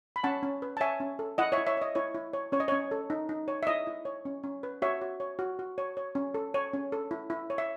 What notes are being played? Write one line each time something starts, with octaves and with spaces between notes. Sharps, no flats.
B5
C#4 F#5 A5
C#4
B4
A5
C#5 E5 G#5
C#4
A4
E4 D#5 F#5
C#5 E5
E4
C#5 E5
C#5 D#5
E4 C#5
E4
C#5
C#4 C#5
D#5
C#4 C#5
A4
D#4
D#4
C#5
E5
E4 D#5
E4
C#5
C#4
C#4
B4
F#4 C#5 E5
F#4
C#5
F#4
F#4
C#5
C#5
C#4
A4
C#5
C#4
A4
E4
E4
C#5
E5